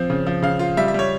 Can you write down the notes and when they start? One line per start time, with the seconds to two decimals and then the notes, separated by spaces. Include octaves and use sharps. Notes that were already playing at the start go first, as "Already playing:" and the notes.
Already playing: F3 C4
0.10 C#3
0.27 F3
0.42 C#3 F5
0.59 F4
0.77 G3 E5
0.88 E5
0.94 G3 C#5